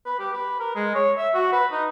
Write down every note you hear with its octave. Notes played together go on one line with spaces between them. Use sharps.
B4
G4
B4
A#4
G#3
C#5
E5
F#4
B4
D#4